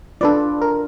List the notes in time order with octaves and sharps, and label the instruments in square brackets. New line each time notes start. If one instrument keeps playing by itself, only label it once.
[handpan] D4 F4 [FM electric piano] A4 B4 D5
[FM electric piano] A#4